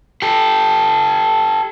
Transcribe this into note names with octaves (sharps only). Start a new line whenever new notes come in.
G4 A4